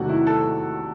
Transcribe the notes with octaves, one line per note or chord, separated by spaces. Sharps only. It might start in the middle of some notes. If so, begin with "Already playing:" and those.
Already playing: E2 C3 D#3 F#3 A3 F#4
E4
A4